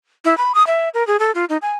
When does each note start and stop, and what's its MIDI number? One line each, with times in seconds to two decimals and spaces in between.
0.25 0.37 64
0.38 0.52 83
0.55 0.66 87
0.67 0.89 76
0.94 1.06 70
1.07 1.17 68
1.20 1.31 69
1.35 1.45 65
1.49 1.57 63
1.62 1.78 80